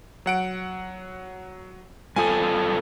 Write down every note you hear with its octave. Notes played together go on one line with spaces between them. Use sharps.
F#3 F#5 D7
G2 F4 A4 G#5